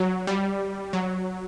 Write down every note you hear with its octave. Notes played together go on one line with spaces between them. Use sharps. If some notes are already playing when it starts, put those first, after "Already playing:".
Already playing: F#3
G3
F#3